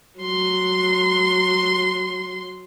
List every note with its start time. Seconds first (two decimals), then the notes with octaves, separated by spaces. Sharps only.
0.20 F#3 C6